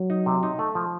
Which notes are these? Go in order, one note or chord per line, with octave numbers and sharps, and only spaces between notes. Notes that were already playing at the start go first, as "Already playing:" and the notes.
Already playing: F#3
D#4
C3
D#4
A3
F3